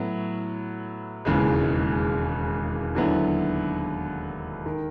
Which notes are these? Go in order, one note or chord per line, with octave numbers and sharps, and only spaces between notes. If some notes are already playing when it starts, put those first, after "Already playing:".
Already playing: A2 F#3 B3 E4
E1 D#2 C#3 E3 G#3
D#2 D3 F#3 B3 E4
D#3